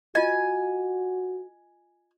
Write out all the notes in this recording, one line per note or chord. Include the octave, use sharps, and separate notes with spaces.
F4 F#4 D#5 G#5